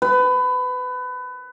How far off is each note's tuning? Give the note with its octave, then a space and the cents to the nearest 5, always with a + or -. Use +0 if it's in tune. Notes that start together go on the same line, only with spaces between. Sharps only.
B4 +25